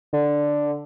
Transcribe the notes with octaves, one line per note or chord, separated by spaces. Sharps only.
D3